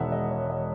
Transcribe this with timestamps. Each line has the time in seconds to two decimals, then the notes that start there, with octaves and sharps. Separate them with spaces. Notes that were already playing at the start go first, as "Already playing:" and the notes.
Already playing: E1 E2 D#3 G#3 E5 F#5
0.12 D#5
0.31 C#5
0.50 D#5